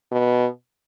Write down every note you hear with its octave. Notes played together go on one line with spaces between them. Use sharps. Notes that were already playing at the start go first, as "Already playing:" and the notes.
B2